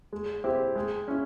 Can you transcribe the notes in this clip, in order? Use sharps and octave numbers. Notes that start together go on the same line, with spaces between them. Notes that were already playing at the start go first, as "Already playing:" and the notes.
G#3
C4 E4 G4 C5
G#3
C#4 E4